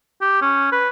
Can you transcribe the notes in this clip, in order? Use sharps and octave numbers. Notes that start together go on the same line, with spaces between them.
G4
C#4
B4